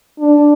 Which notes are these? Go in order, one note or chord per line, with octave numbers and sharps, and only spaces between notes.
D4